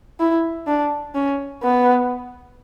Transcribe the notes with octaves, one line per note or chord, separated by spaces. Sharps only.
E4
D4
C#4
B3